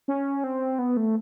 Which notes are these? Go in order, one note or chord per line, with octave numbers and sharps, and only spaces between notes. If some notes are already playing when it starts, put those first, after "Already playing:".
C#4
C4
B3
A3